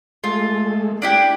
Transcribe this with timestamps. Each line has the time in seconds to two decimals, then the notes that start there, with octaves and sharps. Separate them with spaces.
0.24 G#3 A3 F4
1.02 D4 E4 G4